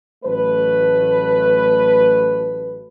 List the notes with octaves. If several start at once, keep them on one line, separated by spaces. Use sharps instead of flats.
A1 F#3 A3 B4